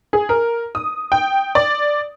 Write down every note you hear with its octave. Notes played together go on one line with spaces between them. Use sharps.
G#4
A#4
D#6
G5
D5